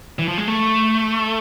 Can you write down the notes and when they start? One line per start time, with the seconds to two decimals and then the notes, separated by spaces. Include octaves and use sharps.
0.19 E3
0.28 F3
0.38 G#3
0.48 A3